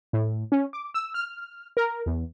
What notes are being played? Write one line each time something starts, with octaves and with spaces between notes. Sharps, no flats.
A2
C#4
D6
E6
F6
A#4
E2